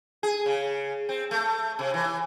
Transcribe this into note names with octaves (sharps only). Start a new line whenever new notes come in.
G#4
C#3
C4
A3
C3
E3